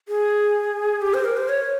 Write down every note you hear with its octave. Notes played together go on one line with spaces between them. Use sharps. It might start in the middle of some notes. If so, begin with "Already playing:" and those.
G#4
G4
C5
A#4
C5
C#5